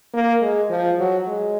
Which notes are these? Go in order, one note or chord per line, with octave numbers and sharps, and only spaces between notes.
A#3
G#3
F3
F#3
G#3